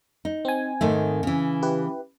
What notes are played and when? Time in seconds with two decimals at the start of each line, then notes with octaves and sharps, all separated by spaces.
0.25 D#4
0.45 C4 G#5
0.81 G#2 D#3 A3
1.23 C#3 E3
1.62 E4 G4 B4